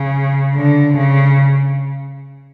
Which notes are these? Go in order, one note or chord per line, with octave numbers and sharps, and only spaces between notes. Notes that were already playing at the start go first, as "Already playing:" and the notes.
Already playing: C#3
D3
C#3